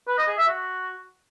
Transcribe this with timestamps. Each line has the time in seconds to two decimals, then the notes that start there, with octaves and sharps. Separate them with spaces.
0.08 B4
0.18 D#5
0.28 G#4
0.38 E5
0.48 F#4